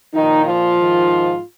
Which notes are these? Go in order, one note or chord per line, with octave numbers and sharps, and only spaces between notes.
A#2 D#3 F3 D#4
F3 F4
G#2 D#3